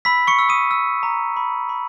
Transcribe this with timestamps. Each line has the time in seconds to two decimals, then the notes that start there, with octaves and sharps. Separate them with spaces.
0.05 B5 E6 B6
0.27 C#6 C#7
0.39 E6
0.49 D#6 D#7
0.71 E6
1.03 A#5
1.37 B5
1.69 B5